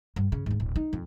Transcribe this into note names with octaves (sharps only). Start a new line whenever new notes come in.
G2
C#3
D2 G#2
D1
D#4
F2